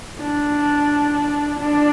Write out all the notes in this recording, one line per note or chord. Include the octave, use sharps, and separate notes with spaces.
D4
D4